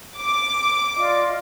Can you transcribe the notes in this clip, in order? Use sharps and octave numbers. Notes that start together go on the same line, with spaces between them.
D6
F4 D5 D#5